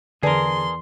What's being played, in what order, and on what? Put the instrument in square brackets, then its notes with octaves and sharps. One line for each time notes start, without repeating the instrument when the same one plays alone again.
[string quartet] E2 C6 [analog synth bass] D3 [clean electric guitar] G#4 A#4 [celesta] B4 D5 A5